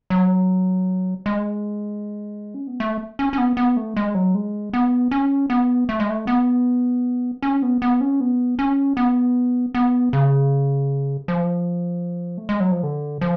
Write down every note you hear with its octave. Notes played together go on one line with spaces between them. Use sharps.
F#3
G#3
C#4
B3
A3
C#4
C#4
B3
B3
A3
G#3
F#3
G#3
B3
C#4
B3
A3
G#3
A3
B3
C#4
B3
B3
C#4
B3
C#4
B3
B3
C#3
F3
A3
G#3
F#3
F3
D3
F3